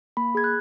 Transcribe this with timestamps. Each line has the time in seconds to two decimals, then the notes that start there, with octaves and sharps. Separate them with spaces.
0.17 A#3 B5
0.35 G#4 G#6
0.44 F#6